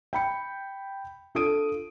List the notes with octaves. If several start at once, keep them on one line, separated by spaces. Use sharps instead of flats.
G5 B5 C#7
D4 F4 A4 D#6 D7 D#7